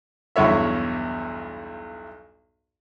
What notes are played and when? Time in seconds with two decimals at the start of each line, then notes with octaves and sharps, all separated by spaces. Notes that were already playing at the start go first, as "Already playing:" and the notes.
0.36 B1 E2 G2 C#5 E5